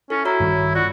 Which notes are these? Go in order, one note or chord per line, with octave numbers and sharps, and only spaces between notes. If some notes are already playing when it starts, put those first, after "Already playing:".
C#4 E4 A4
E4 F#4 C#5 A#5
G2 D#3 G3
F4 F#4 D5